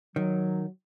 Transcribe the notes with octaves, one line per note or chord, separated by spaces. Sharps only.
D#3 F#3